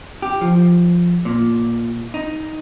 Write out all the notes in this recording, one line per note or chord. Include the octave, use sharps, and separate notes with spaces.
G4
F3
A#2
D#4